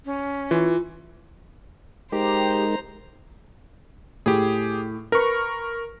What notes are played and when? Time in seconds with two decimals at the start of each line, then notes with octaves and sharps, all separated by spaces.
0.06 C#4
0.51 E3 F4
2.12 G#3 D#4 G4 A#4 C5 A#5
4.26 A2 G4 G#4
5.12 A#4 B4 C#6